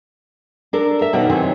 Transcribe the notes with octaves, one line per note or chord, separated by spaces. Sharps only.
D4 A4 A#4
A#4 E5
B2 D#3 C#4 F#4
C3 D#3 E3 F#3 C4